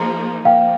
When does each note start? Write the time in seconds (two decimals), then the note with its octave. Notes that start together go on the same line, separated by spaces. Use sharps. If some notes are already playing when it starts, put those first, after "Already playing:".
Already playing: F3 A#3 D#4 G#4 A#5 C6
0.45 F3 A#3 F5 G5